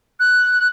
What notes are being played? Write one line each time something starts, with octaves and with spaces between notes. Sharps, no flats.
F#6